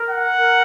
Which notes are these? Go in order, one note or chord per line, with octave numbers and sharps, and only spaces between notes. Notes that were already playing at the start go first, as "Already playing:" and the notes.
Already playing: A#4
F#5
A#4